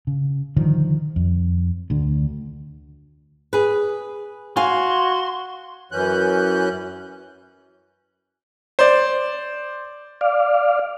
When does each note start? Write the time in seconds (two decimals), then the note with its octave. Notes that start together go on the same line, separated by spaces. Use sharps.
0.07 C#3
0.57 D3 D#3 F3 G3
1.16 F2
1.90 D2 D3
3.53 G#4 B4
4.57 F#4 F5 G#5 C6
5.92 F#2 E3 C#4 F#6 G6
8.79 C5 D5
10.21 D5 F5